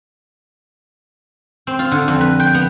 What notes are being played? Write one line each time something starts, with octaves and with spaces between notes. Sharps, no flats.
C4
F4
D3
F2
B4
G5
B3